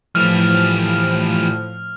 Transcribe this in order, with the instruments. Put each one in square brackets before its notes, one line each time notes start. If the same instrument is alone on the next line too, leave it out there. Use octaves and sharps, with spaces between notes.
[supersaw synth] A2 F3 [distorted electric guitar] E3 G3 [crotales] F6 F7